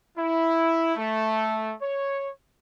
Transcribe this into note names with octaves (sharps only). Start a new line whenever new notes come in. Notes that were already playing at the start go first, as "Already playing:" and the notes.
E4
A3
C#5